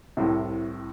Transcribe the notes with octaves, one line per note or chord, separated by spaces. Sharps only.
C2 A2 C3